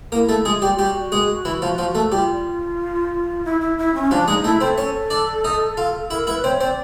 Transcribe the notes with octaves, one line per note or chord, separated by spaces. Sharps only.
A#3 E4 A#4
A3 A4
G#3 F4 G#4
G3 G4
G3 F#4 G4
G#3 G#4
E3 E4
F3 F4
F3 F4
A3 A4
G3 F4 G4
E4
E4
E4
C#4
F3 D4 F4
G#3 D#4 G#4
A3 E4 A4
C4 A4 C5
C#4 C#5
D4 D5
D#4 D#5
F4 F5
E4 A#4 E5
E4 B4 E5
C4 C5 C#5
C4 C5 D5